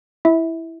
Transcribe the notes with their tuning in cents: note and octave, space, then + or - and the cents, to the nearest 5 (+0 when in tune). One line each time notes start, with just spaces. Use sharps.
E4 +0 E5 -25